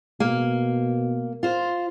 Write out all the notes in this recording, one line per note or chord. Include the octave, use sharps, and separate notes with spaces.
B2 A#3
F4 C5